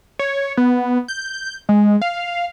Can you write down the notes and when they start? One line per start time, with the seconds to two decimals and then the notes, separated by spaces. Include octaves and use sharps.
0.19 C#5
0.57 B3
1.08 G6
1.69 G#3
2.02 F5